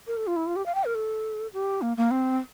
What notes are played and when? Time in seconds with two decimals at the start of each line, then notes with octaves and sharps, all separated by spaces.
0.07 A#4
0.17 A4
0.27 F4
0.36 E4
0.47 F4
0.56 G4
0.66 F5
0.75 G5
0.85 A#4
0.95 A4
1.53 G4
1.82 A#3
1.97 A#3
2.11 C4